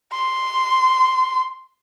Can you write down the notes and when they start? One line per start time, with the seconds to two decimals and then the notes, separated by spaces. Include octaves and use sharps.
0.12 C6